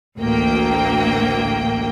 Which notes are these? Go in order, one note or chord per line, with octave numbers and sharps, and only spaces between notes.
A1 D2 A#3 G5